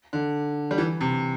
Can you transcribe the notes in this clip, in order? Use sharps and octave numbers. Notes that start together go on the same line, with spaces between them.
D3
G3
E3
C3